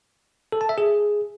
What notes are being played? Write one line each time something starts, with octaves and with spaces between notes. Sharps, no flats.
A4
A5
E5
G#4